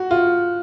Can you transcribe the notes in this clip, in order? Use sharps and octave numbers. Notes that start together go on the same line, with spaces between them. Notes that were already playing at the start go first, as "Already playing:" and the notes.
Already playing: F#4
F4